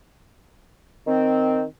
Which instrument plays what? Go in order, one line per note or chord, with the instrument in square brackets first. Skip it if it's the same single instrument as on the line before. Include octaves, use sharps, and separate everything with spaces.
[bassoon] D#3 [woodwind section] C4